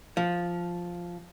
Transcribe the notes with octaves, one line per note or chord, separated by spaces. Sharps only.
F3